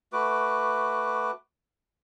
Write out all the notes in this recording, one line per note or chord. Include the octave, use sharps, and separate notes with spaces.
A3 F#4 B4 D6